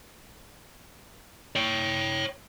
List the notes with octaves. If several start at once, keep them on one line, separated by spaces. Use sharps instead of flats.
C#5 G5